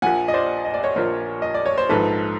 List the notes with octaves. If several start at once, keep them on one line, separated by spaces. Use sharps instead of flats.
A#1 A#2 F3 F#5 G#5
D#5
C5 D5
D#5
D5
C#5 D#5
A#1 A#2 F3 A#4 C5
D#5
D5
C#5
C5
A#1 G#2 F3 A4 B4